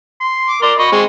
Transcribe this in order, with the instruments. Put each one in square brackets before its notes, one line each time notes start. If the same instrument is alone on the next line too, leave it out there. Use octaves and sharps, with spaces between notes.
[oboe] C6
[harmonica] D6
[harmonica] A#4 C6 [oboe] D5
[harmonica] D#5 B5 [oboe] C#6
[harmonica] G#3 C4